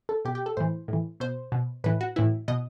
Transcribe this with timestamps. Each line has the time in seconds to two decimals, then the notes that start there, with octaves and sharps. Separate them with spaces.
0.09 A4
0.25 B2 G4
0.35 G4
0.46 A4
0.57 A2 E3 C5
0.88 A2
0.93 E3
1.20 B2 C5
1.52 B2
1.84 A2 E3 B4
2.01 F#4
2.16 A2 E3 E4
2.48 B2 D#5